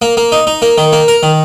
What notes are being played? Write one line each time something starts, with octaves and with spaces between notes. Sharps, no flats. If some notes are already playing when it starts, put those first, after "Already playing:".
A#3
A#3
D#4
D#4
A#3
D#3
A#3
A#4
D#3